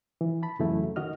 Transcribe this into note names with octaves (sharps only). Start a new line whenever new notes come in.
E3
A5 B5
F2 C#3 E3 F#3 A3 E4
D#3 F#4 D#5 F6